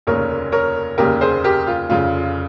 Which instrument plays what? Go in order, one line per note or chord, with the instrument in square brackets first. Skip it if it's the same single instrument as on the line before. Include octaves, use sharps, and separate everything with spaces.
[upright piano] F1 D#2 C#3 A#4 C#5
A#4 C#5
F1 D#2 C#3 G4 A#4
G#4 C5
G4 A#4
F4
F1 F2 C#3 F4